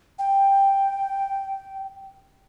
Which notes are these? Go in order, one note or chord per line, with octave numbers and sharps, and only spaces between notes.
G5